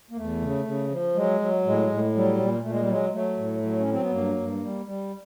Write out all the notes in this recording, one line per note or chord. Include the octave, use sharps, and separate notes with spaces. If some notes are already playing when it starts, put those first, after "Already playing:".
A#3
E2 A3
C#3
C#3
F3
F#3 G#3
F#3
A2 G#3
A2
F#3 G3
A#2
A#2 A3
G#3
G3
F#3 G#3
F#3 A3
A2
F#3
C#4
F#3 C4
B3
G2 A#3
G2
G3
G3